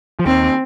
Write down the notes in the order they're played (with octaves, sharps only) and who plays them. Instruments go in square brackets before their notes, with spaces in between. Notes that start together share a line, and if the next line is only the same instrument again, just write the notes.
[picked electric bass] F3
[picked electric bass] D#2 D#3 [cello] C4